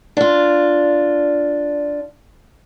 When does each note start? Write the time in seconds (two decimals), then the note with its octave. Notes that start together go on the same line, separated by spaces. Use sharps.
0.17 D4 F4